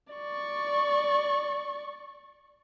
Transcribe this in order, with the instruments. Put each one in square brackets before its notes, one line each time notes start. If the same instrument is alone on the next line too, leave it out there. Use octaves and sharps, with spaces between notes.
[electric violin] D5 C#6